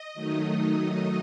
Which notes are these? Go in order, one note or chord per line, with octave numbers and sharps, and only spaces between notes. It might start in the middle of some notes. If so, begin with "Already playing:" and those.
Already playing: D#5
D#3 F#3 A3 D#4